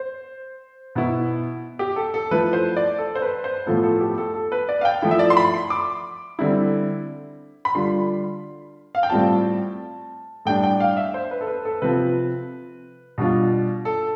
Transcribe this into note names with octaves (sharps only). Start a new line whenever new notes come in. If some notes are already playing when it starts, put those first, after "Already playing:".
Already playing: C5
B2 B3 E4
G4
A4
A4
F3 A3 E4 B4
C5
D5
A4
C5
B4
C5
A2 F3 B3 F4 A4
A4
G4
A4
A4
B4
D5
F5
G5
F3 A3 E4
E5
D5
C6
B5
C6
D6
D3 G3 C4 E4
B5
D3 G3 D4 F4 C6
F5
G5
A2 G3 C4 F4 A5
A2 G3 D4 G5
G5
F5
E5
C5
B4
A4
B4
A4
C3 F3 C4 F4 B4
B2 G3 D4 F4
A4